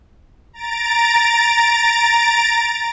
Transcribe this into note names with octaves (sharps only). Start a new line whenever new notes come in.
A#5 A6 D7